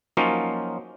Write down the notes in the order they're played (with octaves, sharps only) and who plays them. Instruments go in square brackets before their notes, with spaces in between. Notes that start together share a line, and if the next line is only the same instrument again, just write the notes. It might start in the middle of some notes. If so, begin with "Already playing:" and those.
[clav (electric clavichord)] F3 F#3 A#3 C#4 D#4 F4